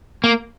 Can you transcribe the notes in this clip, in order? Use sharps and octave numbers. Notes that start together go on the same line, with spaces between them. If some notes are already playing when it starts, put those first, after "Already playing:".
A#3